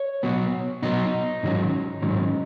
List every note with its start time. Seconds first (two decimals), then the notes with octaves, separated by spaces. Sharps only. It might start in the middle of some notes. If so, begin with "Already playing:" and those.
Already playing: C#5
0.23 B2 F#3 B3
0.82 B2 F#3 B3 D#4
1.43 G#2 D#3 F#3 C#4
2.02 G#2 D#3 F#3 C#4